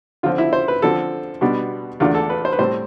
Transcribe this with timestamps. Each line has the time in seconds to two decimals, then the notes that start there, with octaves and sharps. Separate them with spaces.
0.23 D3 F3 C4 F4
0.38 E4
0.53 C5
0.68 B4
0.82 D3 F3 C4 A4
1.41 B2 G3 B3 D4
2.00 E2 D3 A3 D4 F4
2.15 A4
2.30 B4
2.45 C5
2.52 B4
2.59 A2 G3 C4 C5